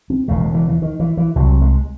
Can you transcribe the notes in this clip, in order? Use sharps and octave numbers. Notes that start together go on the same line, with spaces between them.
C4
E1 E2 C#3 A3
G#3
E3
E3
D#3
E3
E3
C2 C3 F#3
G#3